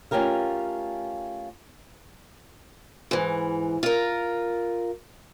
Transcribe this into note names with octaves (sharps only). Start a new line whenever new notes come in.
A3 C#4 F4 G4 A#4 F5
G#2 E3
F4 A#4